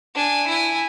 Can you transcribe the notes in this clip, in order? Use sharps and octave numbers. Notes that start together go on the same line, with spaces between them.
D4 G#5
E4 G#5